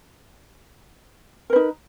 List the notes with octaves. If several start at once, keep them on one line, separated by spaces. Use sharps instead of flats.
D#4 A#4 B4